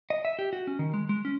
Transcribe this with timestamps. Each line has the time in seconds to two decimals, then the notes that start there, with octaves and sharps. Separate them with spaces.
0.10 D#5
0.25 E5
0.39 G4
0.53 F#4
0.67 C#4
0.79 D#3
0.94 G#3
1.09 G#3
1.25 C#4